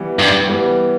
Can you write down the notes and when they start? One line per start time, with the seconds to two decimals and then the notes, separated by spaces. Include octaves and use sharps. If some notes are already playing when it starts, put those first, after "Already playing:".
Already playing: E3 G3 B3
0.19 G2
0.48 E3 G3 B3